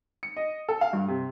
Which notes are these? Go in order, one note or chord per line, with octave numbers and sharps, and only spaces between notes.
C#7
D#5
A4
F5
G2
C3